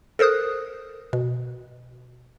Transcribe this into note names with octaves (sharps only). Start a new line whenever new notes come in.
A4 A#4 C5 D#6 F#6
B2